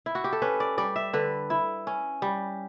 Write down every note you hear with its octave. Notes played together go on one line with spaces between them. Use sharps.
E4
F#4
G4
A4
C#4 B4
D5
G3 D5
E5
D3 B4
E4
C#4
G3